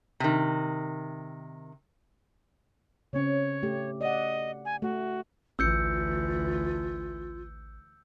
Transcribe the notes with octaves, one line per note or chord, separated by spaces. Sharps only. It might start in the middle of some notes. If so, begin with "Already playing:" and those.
C3 D#3
C#3 C4 C#4 C#5
A3 G4
D5 D#5 F#5
G#5
A3 F#4
A1 D2 E3 F4 E6 G6 C#7